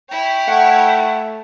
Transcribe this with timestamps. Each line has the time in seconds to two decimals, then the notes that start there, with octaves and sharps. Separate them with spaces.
0.11 E4 C#5 G5
0.48 A3 F#5